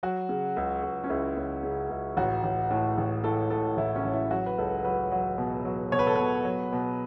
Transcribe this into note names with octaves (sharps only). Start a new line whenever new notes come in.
F#3 F#4
C#3
C#2
C#2
C#4
C#2 E4
C#2
C#3
C#2
A1 F#4
A1
A2
A1
A2 A4
A2 A4
A1 E4
C#4
A1
E4
F#3 F#4
B4
C#2 A4
F#3 B4
F#3
B2
F#3
B2 C#5
B4
A4
B2 B4
F#3
B2